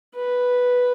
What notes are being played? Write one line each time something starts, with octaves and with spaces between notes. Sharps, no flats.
B4